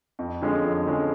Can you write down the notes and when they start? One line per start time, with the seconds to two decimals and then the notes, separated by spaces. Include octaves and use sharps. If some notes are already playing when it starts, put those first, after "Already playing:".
0.19 F2
0.42 D3 F3 G#3 C#4
0.63 F2
0.86 D3 F3 G#3 C#4